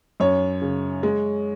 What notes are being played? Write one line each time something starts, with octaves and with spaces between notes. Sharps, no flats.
F#2 C#5
C#3
G#3